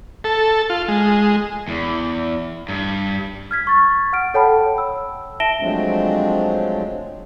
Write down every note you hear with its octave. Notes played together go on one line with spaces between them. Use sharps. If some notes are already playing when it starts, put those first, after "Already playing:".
A4
F4
G#3
E2
G2
F6 G#6 B6
C#6 A6
F#5 F6 D7
A4 C#5 F#5 G5 A5 B5
E6
E5 A5 A#6 D7 E7 G7
F3 F#3 G#3 A3 C4 D4